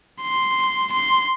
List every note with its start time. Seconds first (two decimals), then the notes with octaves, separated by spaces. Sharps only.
0.21 C6
0.92 C6